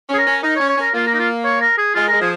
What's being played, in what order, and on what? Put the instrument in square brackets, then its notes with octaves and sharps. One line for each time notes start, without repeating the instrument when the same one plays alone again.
[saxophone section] C#4 [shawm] G#4
[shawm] A#4
[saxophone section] C#4
[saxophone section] D#4 [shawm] A#4
[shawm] C#5
[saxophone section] C#4
[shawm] C#5
[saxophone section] C#4 [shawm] A#4
[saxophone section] A#3 [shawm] F4
[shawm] A#4
D#4
F4
C#5
A#4
G#4
[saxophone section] G#3 [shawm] F4
[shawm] A#4
[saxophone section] G#3
[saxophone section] F3 [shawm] G#4